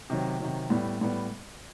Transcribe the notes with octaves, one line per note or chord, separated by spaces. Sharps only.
C3 D#3 F#3
C3 D#3 F#3
A2 G3 B3
A2 G3 B3